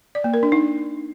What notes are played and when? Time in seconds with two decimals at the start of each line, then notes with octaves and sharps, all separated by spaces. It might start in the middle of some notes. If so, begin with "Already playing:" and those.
0.15 D5
0.24 A#3
0.34 A#4
0.43 D4
0.52 D#4